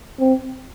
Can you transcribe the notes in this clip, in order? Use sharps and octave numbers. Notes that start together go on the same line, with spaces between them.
C4